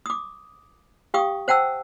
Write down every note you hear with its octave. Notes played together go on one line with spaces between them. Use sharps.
D6 D#6
G4 F5 G5 C#6 D#6
C5 F#5 G5 A5 E6